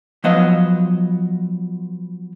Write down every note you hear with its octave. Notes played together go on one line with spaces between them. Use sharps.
F3 F#3 B3 C5 D#5 F5